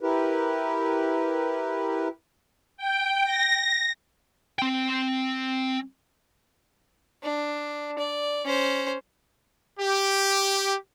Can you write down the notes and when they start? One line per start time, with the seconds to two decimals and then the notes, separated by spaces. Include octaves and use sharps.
0.01 E4 G4 A#4 B4
2.77 G5
3.24 A#6
4.59 C4 G5
7.23 D4
7.99 D5
8.45 C#4 C5
9.80 G4